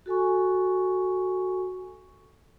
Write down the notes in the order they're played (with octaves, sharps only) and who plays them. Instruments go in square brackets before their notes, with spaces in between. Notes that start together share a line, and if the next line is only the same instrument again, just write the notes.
[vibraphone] F#4 A4 G#5 C#6